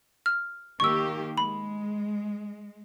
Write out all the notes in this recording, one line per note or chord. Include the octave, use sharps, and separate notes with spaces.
F6
D#3 A#3 G4 C#6 E6
G#3 B5